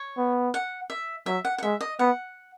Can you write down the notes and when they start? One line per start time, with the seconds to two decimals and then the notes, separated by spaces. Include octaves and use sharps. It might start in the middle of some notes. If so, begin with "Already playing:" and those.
Already playing: C#5
0.18 B3
0.54 F#5
0.90 E5
1.26 F#3 E5
1.45 F#5
1.58 F#5
1.63 G#3 E5
1.81 D#5
1.99 B3 F#5